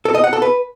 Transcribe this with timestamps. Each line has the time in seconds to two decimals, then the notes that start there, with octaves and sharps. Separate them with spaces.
0.05 A4
0.15 D#5
0.24 F#5
0.33 A4
0.42 B4